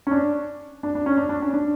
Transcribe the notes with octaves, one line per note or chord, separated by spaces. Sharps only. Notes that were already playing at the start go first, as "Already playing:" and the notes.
C#4
D4
D4
D4
C#4
D4
D4
C#4
D4